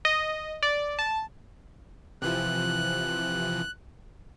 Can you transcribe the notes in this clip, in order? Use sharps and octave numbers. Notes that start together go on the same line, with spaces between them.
D#5
D5
A5
C3 E3 F3 F#6